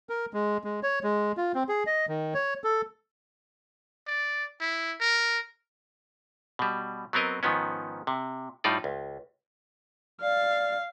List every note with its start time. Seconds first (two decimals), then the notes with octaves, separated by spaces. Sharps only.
0.09 A#4
0.33 G#3
0.64 G#3
0.83 C#5
1.04 G#3
1.37 F4
1.55 C4
1.69 G#4
1.87 D#5
2.08 D#3
2.34 C#5
2.64 A4
4.07 D5
4.60 E4
5.01 A#4
6.59 B2 G3
7.13 F#3 B3 C4 A#4 D#5
7.43 G#2 D#3 F3 B3 C#4
8.07 C3
8.64 A2 G3 D#4 F4 D5
8.84 C#2
10.22 D5 F5